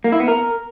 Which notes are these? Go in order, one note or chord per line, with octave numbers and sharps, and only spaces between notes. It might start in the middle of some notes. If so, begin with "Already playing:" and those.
A#3
E4
B3
A#4